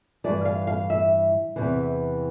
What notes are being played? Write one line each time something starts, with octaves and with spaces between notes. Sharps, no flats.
G2 E3 D5
F5
F5
E5
E2 C3 E3